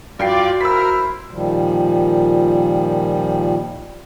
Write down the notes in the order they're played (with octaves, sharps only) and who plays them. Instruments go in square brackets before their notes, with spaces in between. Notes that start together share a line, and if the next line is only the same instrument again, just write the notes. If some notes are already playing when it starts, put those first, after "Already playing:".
[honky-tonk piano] G2 G5 C7 [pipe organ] F4 D5 [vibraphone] F#4
[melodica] E4 C5 [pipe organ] A#4 [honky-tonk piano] E6 B6
[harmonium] A#2 D#3 F3 G3